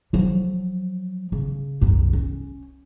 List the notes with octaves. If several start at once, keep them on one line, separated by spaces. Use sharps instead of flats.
F3 F#3
C#3
C2 F#2
C#4